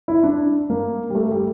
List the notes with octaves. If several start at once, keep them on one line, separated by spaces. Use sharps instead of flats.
E4
D4
A#3
G3
A3
G3